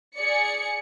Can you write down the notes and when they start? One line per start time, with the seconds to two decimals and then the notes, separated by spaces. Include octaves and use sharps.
0.17 G#4 D5 C#7